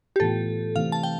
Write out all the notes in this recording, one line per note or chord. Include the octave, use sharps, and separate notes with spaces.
G4
A2 E3 B3 F4 A4
C3 E3 A3 C4 F5
A5
G5